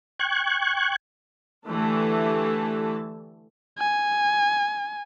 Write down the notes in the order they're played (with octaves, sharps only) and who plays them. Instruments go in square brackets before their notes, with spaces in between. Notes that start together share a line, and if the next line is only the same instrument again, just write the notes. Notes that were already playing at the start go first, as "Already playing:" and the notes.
[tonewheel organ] G5 C#6 F#6 G#6
[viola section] D3 E3 A3 G4 A5
[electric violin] G#5